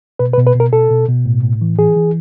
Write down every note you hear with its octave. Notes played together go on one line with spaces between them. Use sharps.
B2 B4
B4
B2
B4
B2
A#4
B2 A4
B2
B2
A2
A2
E3
E3 G#4
E3